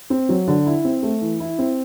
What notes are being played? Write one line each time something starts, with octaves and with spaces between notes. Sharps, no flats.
C4
F#3
D3
E4
C4
A3
E3
E4
C4